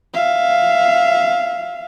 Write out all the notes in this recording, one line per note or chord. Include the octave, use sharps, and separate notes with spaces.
E5 F5